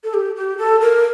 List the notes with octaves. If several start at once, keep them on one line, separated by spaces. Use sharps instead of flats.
A4
G4
G4
A4
A#4